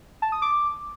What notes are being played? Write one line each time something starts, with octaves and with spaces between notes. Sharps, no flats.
A5
D#6
D6